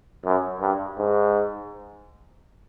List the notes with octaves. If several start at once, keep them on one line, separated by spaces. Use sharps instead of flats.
F#2
G2
G#2